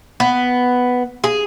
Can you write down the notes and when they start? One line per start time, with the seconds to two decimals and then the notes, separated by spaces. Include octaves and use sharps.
0.20 B3
1.24 G#4